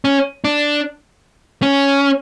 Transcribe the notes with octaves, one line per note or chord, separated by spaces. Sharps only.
C#4
D4
C#4